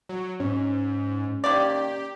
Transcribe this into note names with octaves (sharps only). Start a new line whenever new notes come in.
F#3
G#2 C#4
D#3 A#3 G4 D5